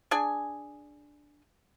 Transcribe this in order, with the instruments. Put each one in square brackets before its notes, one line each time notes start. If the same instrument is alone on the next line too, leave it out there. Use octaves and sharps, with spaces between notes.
[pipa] D4 G#4 G#5